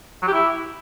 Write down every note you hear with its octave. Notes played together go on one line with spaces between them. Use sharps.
F#3
G4
E4